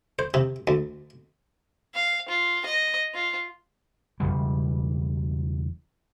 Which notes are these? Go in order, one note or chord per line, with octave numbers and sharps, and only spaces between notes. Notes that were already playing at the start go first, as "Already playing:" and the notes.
C5
C3
D2
F5
F4
D#5
F4
E1 C2 C#3 G3